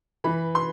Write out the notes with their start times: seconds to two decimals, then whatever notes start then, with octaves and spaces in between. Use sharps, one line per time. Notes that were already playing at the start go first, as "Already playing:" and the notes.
0.24 E3 B5
0.55 C6